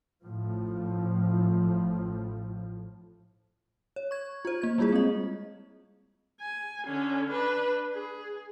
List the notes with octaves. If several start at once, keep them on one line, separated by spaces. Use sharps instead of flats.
A1 A2 F3
C#5
C#6 G#6
F4 C5
A#3 G#6
G3 G#3 E4 F4 G#4
C4 D#5
G#5
D3 C#4
D4 B4
G#4